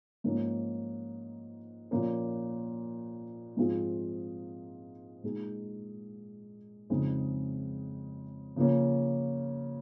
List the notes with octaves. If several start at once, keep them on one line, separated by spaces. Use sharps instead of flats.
G#2 F3 A#3 C#4
A#2 F3 A#3 C#4
G#2 F3 C4 F4 G#4
A#2 G#3 D#4 G#4
F2 C#3 G#3 C4 D#4
C#3 F3 A#3 C#4